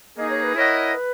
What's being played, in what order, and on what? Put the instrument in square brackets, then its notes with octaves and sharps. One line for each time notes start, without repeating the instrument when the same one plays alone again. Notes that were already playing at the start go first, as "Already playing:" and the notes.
[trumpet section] A#3 D#4 G#4 [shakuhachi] D#5
[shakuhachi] C#5
B4
[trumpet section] E4 A#4 D#5 F#5 [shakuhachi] C#5
[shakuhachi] B4